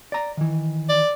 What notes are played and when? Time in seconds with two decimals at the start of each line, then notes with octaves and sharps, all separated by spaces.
0.12 D5 A#5
0.37 D#3 E3
0.89 D5